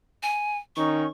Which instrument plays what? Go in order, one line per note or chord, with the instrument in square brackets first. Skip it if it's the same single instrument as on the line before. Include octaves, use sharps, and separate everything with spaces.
[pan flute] G#5
[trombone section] D#3 C#4 D#4 [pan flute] C#6